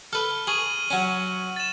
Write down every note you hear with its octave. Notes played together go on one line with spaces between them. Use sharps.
A4 B4 F6
G#4 C#6 D#7 F#7
F#3 C#4
A6 E7